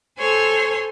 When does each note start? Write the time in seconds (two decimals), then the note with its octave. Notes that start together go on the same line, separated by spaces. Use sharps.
0.18 A4 C5 C#5 G#5 C6